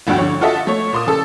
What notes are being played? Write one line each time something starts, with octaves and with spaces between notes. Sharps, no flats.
F1 D2 G2 F#4 G5
D3 C#5
F4 F#4 A4 D#5 E5
A3 C#5
A#2 C6 D#6
C#3 A4 E6